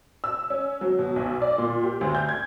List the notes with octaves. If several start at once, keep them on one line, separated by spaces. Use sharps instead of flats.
E6
C#4
F#3
B2
B1
D5
A#2
G4
D2
G6
G#6